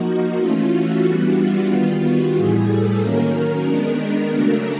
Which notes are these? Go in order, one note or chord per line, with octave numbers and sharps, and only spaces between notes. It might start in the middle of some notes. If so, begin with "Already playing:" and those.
Already playing: F3 A#3 D#4 F#4
E3 A3 C#4 F4
F#4
E3 G3 B3 D4
F4
D#3 G3 B3 F4
F#4
A2 E3 G3 G#4
A4
D#3 F#3 A#3 C#4 A#4
D#3 G#3 B3 D4
A#4
C#3 F#3 A3 D4